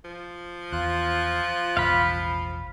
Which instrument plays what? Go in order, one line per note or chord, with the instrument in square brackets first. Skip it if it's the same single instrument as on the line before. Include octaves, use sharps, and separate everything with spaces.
[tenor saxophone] F3
[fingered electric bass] E2 [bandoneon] F4 F#6
[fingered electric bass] E1 A1 E2 [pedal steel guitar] F5 B5